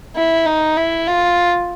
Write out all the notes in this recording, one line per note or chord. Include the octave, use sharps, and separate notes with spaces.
E4
D#4
E4
F4